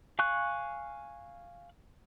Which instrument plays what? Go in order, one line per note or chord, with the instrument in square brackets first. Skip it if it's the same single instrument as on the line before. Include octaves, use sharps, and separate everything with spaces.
[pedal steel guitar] F5 G#5 C#6 F#6